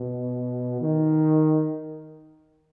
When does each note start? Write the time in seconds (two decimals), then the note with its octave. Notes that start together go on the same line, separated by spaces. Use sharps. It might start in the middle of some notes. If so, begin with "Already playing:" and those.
Already playing: B2
0.81 D#3